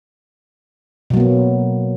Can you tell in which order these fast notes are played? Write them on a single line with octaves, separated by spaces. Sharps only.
B2 F#3 A#3 B3